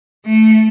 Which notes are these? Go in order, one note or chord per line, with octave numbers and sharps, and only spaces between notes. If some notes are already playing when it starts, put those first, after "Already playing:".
A3